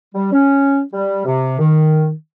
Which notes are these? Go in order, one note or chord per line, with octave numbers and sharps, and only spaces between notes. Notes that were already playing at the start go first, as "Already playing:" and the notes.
G3
C#4
G3
C3
D#3